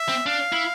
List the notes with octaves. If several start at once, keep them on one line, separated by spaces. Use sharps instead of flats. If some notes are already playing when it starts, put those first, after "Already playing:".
Already playing: E5
C4
D4 F5
E4